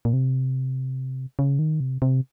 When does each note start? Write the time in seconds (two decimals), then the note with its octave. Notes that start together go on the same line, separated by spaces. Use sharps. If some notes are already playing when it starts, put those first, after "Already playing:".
0.05 A#2
0.13 C3
1.39 C#3
1.59 D#3
1.80 C3
2.02 C3